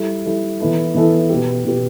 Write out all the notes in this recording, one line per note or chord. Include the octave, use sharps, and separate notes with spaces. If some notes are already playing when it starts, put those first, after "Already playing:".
Already playing: G3 E4 A4
G3 E4 A4
E3 B3 E4 A4
E3 B3 E4 A4
B2 B3 G4
B2 B3 G4